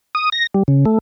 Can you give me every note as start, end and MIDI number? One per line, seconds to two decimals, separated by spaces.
0.15 0.30 87
0.32 0.47 94
0.54 0.63 55
0.68 0.85 49
0.85 0.98 57